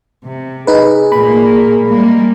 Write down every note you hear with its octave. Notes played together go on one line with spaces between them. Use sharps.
C3
D#4 G#4 B4
A#2 A#3 B5
G3 G#3 A#3